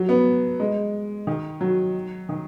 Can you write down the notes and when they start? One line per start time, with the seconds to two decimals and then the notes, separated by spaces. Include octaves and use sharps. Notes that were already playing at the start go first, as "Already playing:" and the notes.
Already playing: F#3
0.09 B3
0.60 G#3
1.27 D#3
1.61 F#3
2.29 D#3